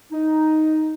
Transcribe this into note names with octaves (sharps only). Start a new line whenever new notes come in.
D#4